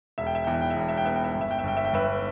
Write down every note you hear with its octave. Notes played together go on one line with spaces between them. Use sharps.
E1 E5
G5
E5
E2 G5
E5
G5
E5
E1 G5
E5
G5
B3 E5
G5
E5
G1 G5
E5
G5
E5
G1 G5
E5
G5
G1 B4 E5